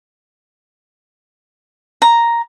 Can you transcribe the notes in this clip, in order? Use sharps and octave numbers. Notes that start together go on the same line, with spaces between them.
A#5